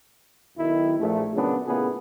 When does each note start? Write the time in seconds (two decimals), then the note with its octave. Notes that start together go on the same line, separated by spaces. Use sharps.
0.58 B1 D#3 E4
0.99 A#1 A3
1.34 A#2 C#3 F#3 B3 C#4 D4
1.67 A#2 C#3 A3 B3 E4 G#4